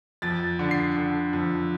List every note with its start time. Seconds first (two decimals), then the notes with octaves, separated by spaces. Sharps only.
0.22 F2 A6
0.59 D3
0.71 C7
0.96 D3
1.33 F2